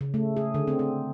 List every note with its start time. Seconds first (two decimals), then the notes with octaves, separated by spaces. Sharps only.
0.01 C#3
0.14 A3
0.37 G#4
0.54 D3
0.68 C4
0.79 C4